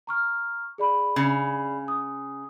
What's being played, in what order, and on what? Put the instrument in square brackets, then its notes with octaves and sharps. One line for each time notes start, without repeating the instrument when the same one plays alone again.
[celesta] A#5 C#6 F6
G#4 D5 B5
[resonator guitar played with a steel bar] C#3
[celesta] D#6